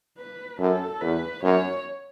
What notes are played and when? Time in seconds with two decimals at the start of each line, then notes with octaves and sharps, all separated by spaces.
0.18 B4
0.60 F#2 A4
1.01 E2 B4
1.43 F#2 C#5